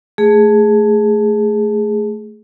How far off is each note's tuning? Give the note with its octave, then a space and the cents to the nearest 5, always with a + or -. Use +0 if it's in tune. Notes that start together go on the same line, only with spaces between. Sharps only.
A3 +0 G#4 +0